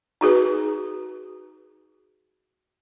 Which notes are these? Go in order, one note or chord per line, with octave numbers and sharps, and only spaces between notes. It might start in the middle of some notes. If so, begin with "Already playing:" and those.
D#4 F#4 G#4 B4